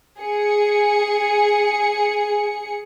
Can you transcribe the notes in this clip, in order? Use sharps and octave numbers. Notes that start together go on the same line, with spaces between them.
G#4 C#7